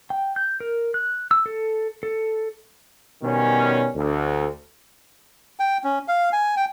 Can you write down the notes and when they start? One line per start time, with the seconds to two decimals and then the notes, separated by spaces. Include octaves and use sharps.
0.10 G5
0.36 G6
0.60 A#4
0.94 F#6
1.31 E6
1.46 A4
2.03 A4
3.23 B2 D#3 G3 B3 C#4
3.96 D2
5.60 G5
5.84 C#4
6.08 F5
6.33 G#5
6.57 G5